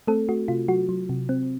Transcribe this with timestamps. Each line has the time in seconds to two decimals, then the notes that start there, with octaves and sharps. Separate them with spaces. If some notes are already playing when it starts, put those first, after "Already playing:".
0.07 A3 C4 A4
0.29 A3 F#4
0.48 C3 F4
0.68 F#3 F#4
0.89 F#3
1.09 C3
1.29 C4